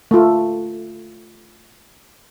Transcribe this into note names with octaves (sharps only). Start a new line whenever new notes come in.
A3 F4